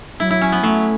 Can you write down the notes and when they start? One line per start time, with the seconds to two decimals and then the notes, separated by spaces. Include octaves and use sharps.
0.20 F#3 E4
0.31 E4
0.41 C#4
0.52 B3
0.63 F#3 A3